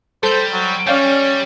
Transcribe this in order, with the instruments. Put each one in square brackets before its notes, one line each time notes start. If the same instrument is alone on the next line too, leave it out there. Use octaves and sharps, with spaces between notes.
[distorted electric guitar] G3 [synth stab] A4 G6 [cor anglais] C5
[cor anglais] F#3
[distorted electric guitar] G3 [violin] C#4 [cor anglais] C#5 [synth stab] D5 F5 G5